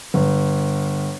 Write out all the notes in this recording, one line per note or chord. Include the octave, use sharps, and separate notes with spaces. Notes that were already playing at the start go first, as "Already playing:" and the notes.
G1